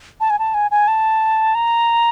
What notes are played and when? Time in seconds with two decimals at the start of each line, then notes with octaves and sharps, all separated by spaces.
0.20 A5
0.30 G#5
0.39 A5
0.54 G#5
0.71 G#5
0.88 A5
1.55 A#5